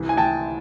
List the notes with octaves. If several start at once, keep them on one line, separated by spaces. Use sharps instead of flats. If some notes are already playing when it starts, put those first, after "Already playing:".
Already playing: C2 E3
G#5
E3 G5 A5